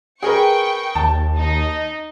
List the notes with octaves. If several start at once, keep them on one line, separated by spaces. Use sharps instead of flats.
G#4 A#4 B4 G5 C#6
D#2 A5
D#4